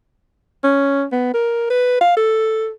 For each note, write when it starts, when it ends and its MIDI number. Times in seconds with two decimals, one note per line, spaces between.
0.64 1.04 61
1.12 1.34 59
1.34 1.68 70
1.70 1.96 71
2.01 2.13 77
2.17 2.70 69